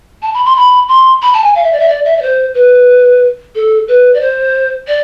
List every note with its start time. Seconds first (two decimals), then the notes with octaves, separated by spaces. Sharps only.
0.22 A5
0.34 B5
0.45 C6
0.56 B5
0.88 C6
1.22 B5
1.33 A5
1.44 G#5
1.55 F5
1.64 E5
1.72 D5
1.79 E5
1.88 D5
2.04 E5
2.17 D5
2.22 C5
2.54 B4
3.55 A4
3.88 B4
4.14 D5
4.20 C5
4.87 D5